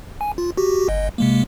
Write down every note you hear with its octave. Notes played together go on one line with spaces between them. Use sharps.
G#5
F4
F#4 G4
G1 D#5
C3 G#3 A#3